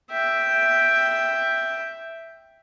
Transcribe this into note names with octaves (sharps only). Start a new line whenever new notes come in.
E5 G5